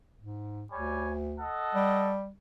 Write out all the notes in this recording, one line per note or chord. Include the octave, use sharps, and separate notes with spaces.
G#2
D2 G3 C#5 G#5
A4 D#5 F#5
G3